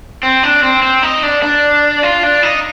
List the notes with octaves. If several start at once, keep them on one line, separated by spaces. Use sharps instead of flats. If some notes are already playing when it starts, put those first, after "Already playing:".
C4
D4
C4
C4
D#4
D4
D4
F4
D4
D#4